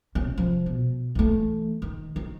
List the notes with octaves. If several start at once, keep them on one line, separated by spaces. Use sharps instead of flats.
C3 C#4
F3
B2
E3 A3
D#3
D#3